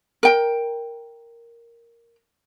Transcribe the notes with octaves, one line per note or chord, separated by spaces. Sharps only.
A#4 G5